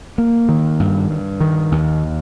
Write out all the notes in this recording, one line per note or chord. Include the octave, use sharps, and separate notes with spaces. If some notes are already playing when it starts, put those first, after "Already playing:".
A#3
D#3
G2
G2
D#3
D#2